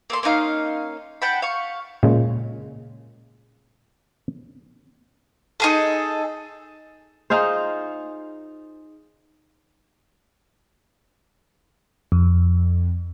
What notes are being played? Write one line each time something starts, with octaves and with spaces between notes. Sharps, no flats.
A#3 A4 C6
A#3 C#4 D#4 F5
F#5 G5 A5 B5
F5 C#6
A#2 C#3 G#3
D#4 G#4 A4
D#4 F4 G#4 C5
F2